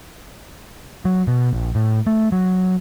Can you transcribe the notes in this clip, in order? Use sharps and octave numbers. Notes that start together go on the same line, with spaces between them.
F#3
B2
A#1
A2
A3
F#3